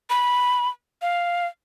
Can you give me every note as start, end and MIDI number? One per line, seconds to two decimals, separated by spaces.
0.10 0.69 83
1.02 1.47 77